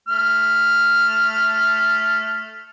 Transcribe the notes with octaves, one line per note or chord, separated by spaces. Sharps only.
A3 F6